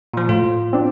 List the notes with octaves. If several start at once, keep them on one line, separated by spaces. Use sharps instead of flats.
A#2 F3
A2 F4
C4 D4